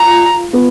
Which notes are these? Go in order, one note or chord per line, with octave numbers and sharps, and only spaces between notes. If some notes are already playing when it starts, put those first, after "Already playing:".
Already playing: F4 A#5
B3